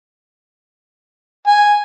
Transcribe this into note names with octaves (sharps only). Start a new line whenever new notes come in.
G#5